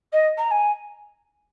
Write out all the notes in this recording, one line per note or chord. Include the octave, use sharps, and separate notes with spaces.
D#5
A#5
G#5